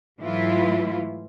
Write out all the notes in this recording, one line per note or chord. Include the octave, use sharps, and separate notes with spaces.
G#2 E3 F#3 A3 E4 F4